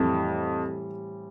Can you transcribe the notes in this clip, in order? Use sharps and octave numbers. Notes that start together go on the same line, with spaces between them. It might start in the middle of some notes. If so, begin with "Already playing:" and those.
Already playing: F2 A2 E3 G3 C4